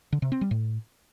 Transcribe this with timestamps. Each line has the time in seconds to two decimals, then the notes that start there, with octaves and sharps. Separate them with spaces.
0.12 D3
0.22 C3
0.32 C4
0.41 G3
0.51 A2